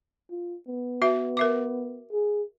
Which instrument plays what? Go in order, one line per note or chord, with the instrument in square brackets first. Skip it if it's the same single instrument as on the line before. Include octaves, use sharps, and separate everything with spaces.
[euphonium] F4
B3
[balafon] F#4 B4 E5
A#4 E5 D6
[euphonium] G#4